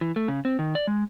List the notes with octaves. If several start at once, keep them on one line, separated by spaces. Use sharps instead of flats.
E3
A3
C#3
C4
D#3
D5
G#3